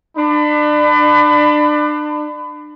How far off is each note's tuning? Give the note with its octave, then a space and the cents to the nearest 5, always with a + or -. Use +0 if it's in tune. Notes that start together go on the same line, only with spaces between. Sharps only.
D4 +30 B5 +30